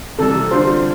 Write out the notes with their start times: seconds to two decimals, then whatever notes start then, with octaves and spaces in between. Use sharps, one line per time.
0.19 C3 E3 G3 A4
0.51 D3 G3 D4 F4 C5